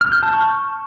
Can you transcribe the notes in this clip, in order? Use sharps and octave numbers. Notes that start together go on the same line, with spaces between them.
F6
G6
A5
C#6